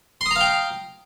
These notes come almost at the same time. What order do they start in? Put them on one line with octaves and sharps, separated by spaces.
C6 D#6 A#5 F5 G5